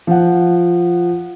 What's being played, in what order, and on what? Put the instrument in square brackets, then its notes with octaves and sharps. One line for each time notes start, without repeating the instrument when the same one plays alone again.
[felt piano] F3 F#5